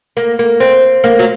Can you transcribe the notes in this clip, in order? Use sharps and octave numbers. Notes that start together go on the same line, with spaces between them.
A#3
A#3
C4
A#3
F#3